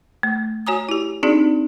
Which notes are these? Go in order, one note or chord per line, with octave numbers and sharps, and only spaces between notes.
A3
F#4 C#5 G#5 A#5 D#6
E4 G4
C4 D4 D#4 F#4 G#4 D5